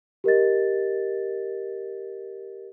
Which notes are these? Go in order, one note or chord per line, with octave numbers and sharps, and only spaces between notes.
G4 A#4 D#5 A6